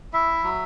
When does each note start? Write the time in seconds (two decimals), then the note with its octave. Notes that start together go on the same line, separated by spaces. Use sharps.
0.13 E4 E5
0.43 F#3